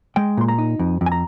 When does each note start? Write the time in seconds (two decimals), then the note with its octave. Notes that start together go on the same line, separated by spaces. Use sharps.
0.16 G#3 G5
0.37 A#2 C6
0.48 A#5
0.58 D#4
0.79 F2
1.01 F2
1.06 G#5
1.12 A#5